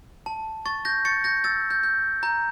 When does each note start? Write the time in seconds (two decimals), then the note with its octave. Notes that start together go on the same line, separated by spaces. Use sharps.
0.26 A5
0.66 C#6 A6
0.85 G6 A#6
1.05 C#6 A6 C#7
1.24 G6 A#6
1.44 E6 A6
1.70 G6
1.83 G6
2.23 A#5 G6